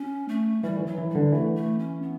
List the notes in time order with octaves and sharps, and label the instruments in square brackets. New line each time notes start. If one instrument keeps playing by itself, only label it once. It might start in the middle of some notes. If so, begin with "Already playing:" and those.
Already playing: [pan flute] C#4
A3
[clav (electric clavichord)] E3 [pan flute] G3
[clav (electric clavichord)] E3
[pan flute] F#3
[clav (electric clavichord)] E3
[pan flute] G3
[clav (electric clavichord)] D3
[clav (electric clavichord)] E3 [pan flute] A3
[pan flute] A3
C#4
B3